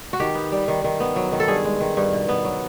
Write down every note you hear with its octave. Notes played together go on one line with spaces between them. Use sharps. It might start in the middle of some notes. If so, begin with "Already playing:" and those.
F#4
D#3 G4
B3
G3
D#3
D#3
B3
F#3
D#3
A4
G2 G#4
G#3
D#3
G2
B2
B3
F#3